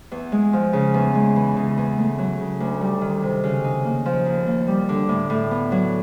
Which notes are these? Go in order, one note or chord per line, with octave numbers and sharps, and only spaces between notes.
E2
G#3
F3
C#3
E2
G#3
E3
C#3
E2
A3
F#3
C#3
D2
G3
D#3
C3
C#3
D#4
A#3
F3
D#2
A#3
G3
D3
A2
A2
B3
F#3